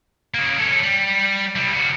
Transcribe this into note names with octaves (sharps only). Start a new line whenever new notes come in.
C#3 A#3
C#4 A4
G3
G3 E4
C#3 F#4